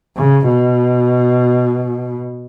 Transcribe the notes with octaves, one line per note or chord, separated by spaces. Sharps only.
C#3
B2